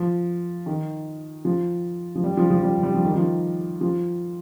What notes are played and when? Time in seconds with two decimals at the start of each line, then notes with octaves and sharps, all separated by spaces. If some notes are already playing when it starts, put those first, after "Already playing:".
Already playing: F3
0.66 D#3
1.45 F3
2.15 F3
2.24 G3
2.37 F3
2.50 F3
2.63 G3
2.83 G3
2.94 F3
3.05 D#3
3.15 F3
3.81 F3